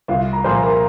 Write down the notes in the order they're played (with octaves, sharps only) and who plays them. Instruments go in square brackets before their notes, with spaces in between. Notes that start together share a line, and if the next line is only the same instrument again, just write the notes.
[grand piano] C2 [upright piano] F4 F5
[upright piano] A#5
[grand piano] A#2 F3 A#3 [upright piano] C5 C6
[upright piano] A#4 A#5